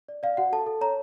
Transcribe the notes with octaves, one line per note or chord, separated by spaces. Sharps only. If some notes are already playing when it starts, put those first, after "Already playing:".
D5
D5 F5
F#4 F#5
A4 A5
A4
C#5 A#5